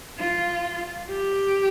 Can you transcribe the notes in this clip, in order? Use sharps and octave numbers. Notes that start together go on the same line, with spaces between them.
F4
G4